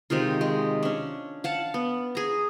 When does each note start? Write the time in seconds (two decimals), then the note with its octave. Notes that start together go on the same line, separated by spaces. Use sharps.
0.10 C3 D#3 G#3 F4
0.41 G#3
0.83 C#4 D4
1.44 F5 F#5 A5
1.74 B3
2.15 G#4 A#5